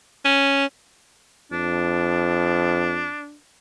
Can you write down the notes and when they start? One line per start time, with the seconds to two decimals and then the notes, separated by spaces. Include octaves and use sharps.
0.25 C#4
1.52 F2 D4